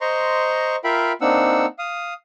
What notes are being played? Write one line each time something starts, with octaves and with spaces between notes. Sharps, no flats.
C5 D#5 A#5 C6 C#6
F4 A#4 E5 F5 G5 B5
A#3 C4 D4 D#4 F#5 E6
F5 D#6